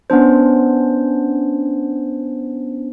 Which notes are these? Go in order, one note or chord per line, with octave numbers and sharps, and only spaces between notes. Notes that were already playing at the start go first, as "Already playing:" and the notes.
B3 C#4 D4 C5